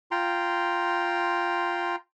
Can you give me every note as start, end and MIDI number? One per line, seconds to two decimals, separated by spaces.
0.11 1.96 65
0.11 1.96 79
0.11 1.96 82
0.11 1.96 84